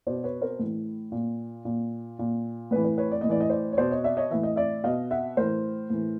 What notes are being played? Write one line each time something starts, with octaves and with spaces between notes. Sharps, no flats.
B2 C5 D5
B4 C#5
A#4 C5
A2 E3
A#2
A#2
A#2
A2 E3 B4
B4
B4 C#5
D5
A2 D#5
E3 D5
D#5
C5 D5
C#5
B2 C5 D5
C#5 D#5
D5 E5
C#5 D#5
A2 E3 E5
D#5
D5 E5
B2 D#5 F5
E5 F#5
A2 E3 A#4 C5
A2 E3